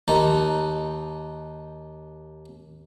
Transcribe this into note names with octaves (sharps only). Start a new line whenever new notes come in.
D#2 D#4 A4